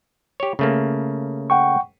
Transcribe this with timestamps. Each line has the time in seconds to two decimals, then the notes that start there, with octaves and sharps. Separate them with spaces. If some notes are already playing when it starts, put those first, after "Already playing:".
0.40 G4 C#5
0.59 C#3 A3 A#3
1.50 F#5 G5 C#6